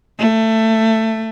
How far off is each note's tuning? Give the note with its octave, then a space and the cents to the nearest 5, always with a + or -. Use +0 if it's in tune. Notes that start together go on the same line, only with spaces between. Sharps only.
A3 +15